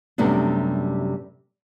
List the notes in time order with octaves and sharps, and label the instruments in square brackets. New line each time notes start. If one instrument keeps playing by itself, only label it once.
[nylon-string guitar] F#2 C3 G3 A3 B3 D4